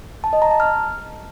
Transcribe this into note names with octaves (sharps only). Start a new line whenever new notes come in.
A5
D#5
A#5
A5
F6